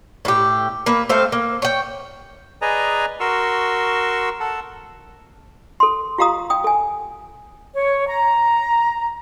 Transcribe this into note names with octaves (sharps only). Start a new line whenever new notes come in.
A2 G4
A#3 B4
A3 C4 C5 F5
A#3
C#5 G5
G#4 B4 D5 D#5 G#5 A#5
F#4 A#4 C6 C#6 E6
A4 F#5 A5
A4 C6
F4 G4 F5 A#5 D#6
G5 D#6
A4 G#5
C#5
A#5